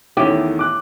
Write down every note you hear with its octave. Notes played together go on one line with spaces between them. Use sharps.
E2 D#3 A3 C#4 E4 G4
D6 F#6